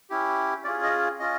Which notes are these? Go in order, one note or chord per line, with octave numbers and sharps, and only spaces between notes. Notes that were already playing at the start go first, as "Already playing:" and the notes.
C#4 E4 G4
C#4 F4 G#4 D5
D#5
C#4 F4 D#5